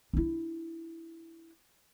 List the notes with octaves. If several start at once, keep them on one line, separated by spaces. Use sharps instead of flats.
D4 E4